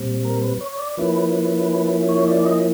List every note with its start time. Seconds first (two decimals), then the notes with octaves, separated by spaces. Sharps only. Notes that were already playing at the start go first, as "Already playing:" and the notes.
Already playing: A#2 G3 C4
0.25 A#4
0.43 B4
0.61 C#5
0.79 D5
0.97 F3 A#3 C#4 E4 B4
2.09 C#5
2.28 D5
2.45 D#5